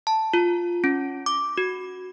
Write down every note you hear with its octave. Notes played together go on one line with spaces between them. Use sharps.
A5
F4
C#4
D6
F#4